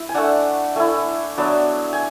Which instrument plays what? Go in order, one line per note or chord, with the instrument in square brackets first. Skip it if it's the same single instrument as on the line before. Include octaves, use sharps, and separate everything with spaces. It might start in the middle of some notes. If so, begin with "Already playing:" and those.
Already playing: [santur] E4
G#5
A3 D4 F#5
A3 E4 G#5
F#3 B3 D4
G#5